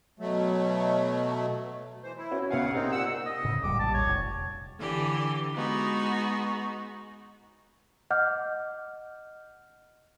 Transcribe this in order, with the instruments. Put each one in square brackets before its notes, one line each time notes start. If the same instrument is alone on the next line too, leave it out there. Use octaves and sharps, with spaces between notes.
[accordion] B2 F#3 A3
E3 C5
E4
[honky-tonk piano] C#4 F#4
[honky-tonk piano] B1 C#4 G#5 [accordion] C#3 F5 F#5
[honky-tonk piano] C3 [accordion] A#3 C4 D#4
[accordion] A#2 F#5 E6
[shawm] D#5
[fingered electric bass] A2 C#3
[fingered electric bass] D#1 G3 [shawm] D6
[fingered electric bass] A#1 G3 [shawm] A5
[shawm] C#5
[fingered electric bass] F1
[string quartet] D3 E3 G4
G#3 B3 D#4 F#4
[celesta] D#5 F#5 D6 F6 G6